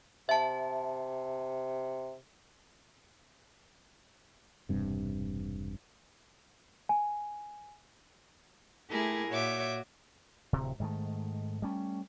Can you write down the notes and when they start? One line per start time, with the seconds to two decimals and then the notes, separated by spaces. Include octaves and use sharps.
0.29 C3 E5 A5
4.69 E1 G2 C3
6.89 G#5
8.91 A3 E4 G4 G#4 A#4
9.29 A#2 F#4 C#5 E5 D6 G6
10.53 D1 C3
10.80 G#2 D#3 A3
11.62 G3 A3 C#4